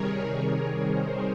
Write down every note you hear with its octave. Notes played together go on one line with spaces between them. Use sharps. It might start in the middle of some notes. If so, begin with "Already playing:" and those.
Already playing: C3 D#3 G3 G#4 A#4 C#5
A#4
G#4 C5